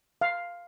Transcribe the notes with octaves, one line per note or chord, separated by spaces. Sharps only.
F5